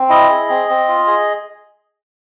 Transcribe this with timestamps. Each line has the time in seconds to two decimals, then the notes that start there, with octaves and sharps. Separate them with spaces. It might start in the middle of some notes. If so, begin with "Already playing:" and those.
Already playing: C4
0.09 E4 D#5
0.29 G#4
0.49 C4
0.69 C4
0.88 F4
1.07 G#4